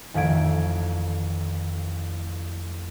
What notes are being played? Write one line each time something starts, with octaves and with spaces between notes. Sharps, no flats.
A1 F2 D#3 E5 G#6 D7